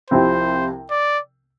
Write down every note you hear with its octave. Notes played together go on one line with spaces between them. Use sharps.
C2 C3 F3 C4 E4 C5
D5